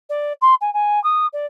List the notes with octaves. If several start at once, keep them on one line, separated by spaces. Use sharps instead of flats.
D5
C6
G#5
G#5
D#6
D5